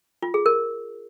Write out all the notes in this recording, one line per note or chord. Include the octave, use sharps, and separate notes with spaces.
F4
G#4
A#4